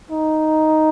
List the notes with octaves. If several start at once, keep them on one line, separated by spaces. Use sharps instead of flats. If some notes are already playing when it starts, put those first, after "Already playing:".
D#4